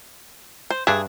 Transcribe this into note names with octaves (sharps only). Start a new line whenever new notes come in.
C5
G2 D4 G#4 E5